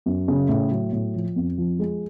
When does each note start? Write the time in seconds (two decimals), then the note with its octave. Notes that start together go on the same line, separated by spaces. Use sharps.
0.06 F#2
0.28 C#3
0.49 A2
0.71 F#3
0.93 A2
1.15 F3
1.36 F2
1.58 F3
1.79 G#3